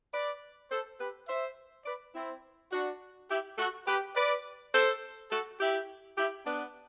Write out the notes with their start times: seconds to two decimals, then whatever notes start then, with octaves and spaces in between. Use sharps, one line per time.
0.14 B4 D5
0.71 A4 C5
1.00 G4 B4
1.28 C5 E5
1.86 B4 D5
2.15 C4 E4
2.72 D4 F#4
3.30 E4 G4
3.58 F#4 A4
3.87 G4 B4
4.16 B4 D5
4.74 A4 C5
5.32 F#4 A4
5.60 E4 G4
6.18 E4 G4
6.46 B3 D4